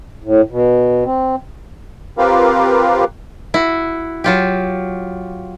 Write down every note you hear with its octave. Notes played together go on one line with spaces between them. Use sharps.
A2
B2
C4
C4 F4 G4 A#4 B4 F5
E4 F#4
F#3 F4 G4